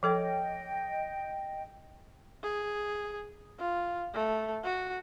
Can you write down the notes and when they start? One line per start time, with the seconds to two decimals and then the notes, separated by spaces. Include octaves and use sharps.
0.03 F3 A4 C#5 D#5 G5
2.43 G#4
3.59 F4
4.14 A3
4.64 F#4